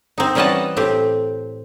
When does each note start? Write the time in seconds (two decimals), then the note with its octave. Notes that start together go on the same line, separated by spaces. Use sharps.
0.18 C4 D#4
0.35 E3 G3 C#4 D#5 F#5 A5
0.77 A2 C4 G4